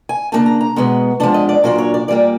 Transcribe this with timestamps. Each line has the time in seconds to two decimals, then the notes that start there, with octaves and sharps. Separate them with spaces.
0.09 G#5
0.32 C#3 F3 A#3 D4 A5
0.46 A#5
0.61 A#5
0.76 B2 G#3 B3
1.20 F3 G#3 B3 D4 A5
1.34 D#5
1.49 D5
1.64 A#2 F#3 A#3 D4 C5
1.78 C#5
1.94 D5
2.08 A#2 G3 A#3 D5